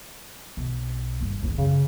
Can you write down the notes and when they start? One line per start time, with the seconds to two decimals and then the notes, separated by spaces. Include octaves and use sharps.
0.57 B1
1.20 D1 G1
1.43 A1 E2
1.58 F#2 C#3